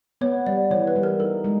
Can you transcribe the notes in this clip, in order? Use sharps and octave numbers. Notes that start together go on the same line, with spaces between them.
B3 C#5
G3 D5
E3 C#5
B4
G3
A#4
D#4 A4
G#3